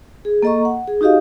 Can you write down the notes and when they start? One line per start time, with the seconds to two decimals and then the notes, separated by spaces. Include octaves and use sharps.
0.25 G#4
0.43 A#3 A4 D#5 A#5 C#6
0.65 F#5
0.88 G#4
1.01 D#4 F#4 G4 D#5 F5